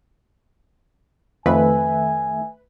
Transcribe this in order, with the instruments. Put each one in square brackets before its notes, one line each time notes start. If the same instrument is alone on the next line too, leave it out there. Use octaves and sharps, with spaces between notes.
[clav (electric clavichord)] F2 [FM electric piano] D#3 A3 E5 [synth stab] B4 [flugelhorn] G#5